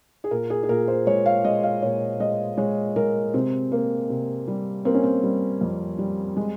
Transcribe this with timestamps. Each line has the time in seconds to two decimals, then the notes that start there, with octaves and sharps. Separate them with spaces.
0.24 G#4
0.31 A#2 A#4
0.50 G#4
0.63 G#4
0.69 A#2 A#4
0.88 C5
1.07 G#3 C#5
1.26 F5
1.44 G#3 D#5
1.63 F5
1.82 A#2 C#5
2.20 G#3 D#5
2.58 G#3 C#5
2.96 G#3 A#4
3.34 C3 C4
3.72 A#3
4.10 C3
4.48 G3
4.85 A#3 C4
4.94 C#4
5.04 C4
5.23 G3
5.61 F2
5.98 G3
6.37 G#3